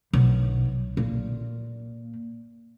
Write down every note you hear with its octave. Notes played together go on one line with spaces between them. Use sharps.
B1
A#2